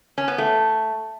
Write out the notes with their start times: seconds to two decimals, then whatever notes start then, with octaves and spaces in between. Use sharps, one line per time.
0.18 C#4
0.28 B3
0.38 A3